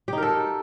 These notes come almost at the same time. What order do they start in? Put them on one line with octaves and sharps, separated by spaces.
G4 D#4 A#4 A4